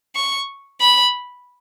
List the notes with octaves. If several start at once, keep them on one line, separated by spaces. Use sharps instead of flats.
C#6
B5